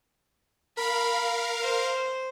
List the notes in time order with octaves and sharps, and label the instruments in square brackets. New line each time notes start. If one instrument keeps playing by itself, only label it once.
[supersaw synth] A#4 F5 [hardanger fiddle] B5
[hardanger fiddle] C5